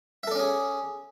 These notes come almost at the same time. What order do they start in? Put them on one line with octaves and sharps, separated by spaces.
E5 A4 D5 C#4 G#4